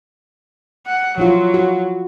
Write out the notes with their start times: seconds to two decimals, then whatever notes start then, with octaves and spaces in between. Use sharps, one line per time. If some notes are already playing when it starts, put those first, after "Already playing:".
0.87 F#5
1.18 F3 F#3 E4 F4
1.54 F#4